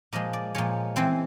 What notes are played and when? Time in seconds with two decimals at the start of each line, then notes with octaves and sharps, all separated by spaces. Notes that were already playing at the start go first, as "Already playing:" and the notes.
0.13 A#2 F3 G#3 D#5
0.33 D5
0.55 A#2 F3 G#3 C#5
0.96 E3 G#3 C4 C5